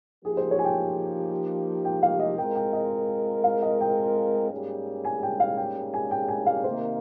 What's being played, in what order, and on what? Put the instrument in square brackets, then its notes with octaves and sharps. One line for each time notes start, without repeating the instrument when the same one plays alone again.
[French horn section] F3 A#3 D#4 G4 [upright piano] G#4
[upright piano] C5
C#5
G#5
G5
G5
F5
D#5
[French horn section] G#3 C4 F4 A#4 [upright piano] G5
[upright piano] G5
D#5
F5
D#5
G5
[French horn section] G#2 G3 A#3 C#4 G#4
[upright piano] G#5
G5
F5
G5
G#5
G5
G#5
F5
[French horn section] C3 D#3 A#3 [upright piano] C5